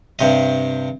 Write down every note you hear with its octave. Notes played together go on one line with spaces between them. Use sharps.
G2 C3 D#5